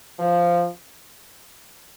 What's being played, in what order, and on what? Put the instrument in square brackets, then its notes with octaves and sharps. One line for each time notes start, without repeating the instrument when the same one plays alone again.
[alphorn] F3